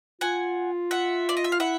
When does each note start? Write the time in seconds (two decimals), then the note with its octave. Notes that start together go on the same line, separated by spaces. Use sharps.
0.21 F4 F#5 G#5
0.91 E5 F#5
1.29 D5
1.37 D#5
1.44 E5
1.52 F5
1.60 E4 E5 F#5